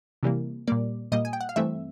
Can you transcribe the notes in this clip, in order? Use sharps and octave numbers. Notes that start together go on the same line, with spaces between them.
C3 E3 G3 A#3
A#2 G3 A#3 D5
A#2 G3 A#3 D#5
G#5
G5
F#5
F5
G2 E3 A3 C4 E5